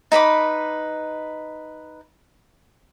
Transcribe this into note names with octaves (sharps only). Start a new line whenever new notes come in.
D#4 B4 B5 D6